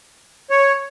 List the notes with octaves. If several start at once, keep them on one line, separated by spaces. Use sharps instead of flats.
C#5